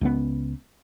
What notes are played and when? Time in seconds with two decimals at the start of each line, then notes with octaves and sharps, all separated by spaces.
0.01 C#2 B3